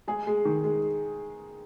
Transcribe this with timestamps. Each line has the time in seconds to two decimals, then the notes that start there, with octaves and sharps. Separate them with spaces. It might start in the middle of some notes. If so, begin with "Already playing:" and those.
0.08 G#3 G#4
0.27 G#3
0.45 D#3
0.64 G#3